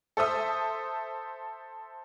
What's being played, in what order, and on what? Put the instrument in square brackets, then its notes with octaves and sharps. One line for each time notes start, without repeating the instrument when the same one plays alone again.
[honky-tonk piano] A4 C5 E5 D#6